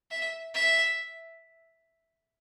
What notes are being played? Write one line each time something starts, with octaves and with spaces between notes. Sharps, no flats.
E5
E5